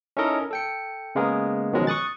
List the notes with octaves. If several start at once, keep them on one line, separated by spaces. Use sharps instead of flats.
C#4 D#4 E4 A4 A#4 D#5
A4 G5 C#7
C#3 G#3 A#3 B3 G#4 A#4
B2 D#3 F3 F#3 G#3 C#4
C#6 D#6 F#6 A6